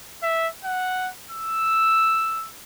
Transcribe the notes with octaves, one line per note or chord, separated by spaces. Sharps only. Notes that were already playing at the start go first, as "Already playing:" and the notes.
E5
F#5
E6